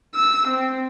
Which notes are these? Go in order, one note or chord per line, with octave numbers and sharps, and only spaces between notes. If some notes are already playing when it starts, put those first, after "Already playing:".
E6
C4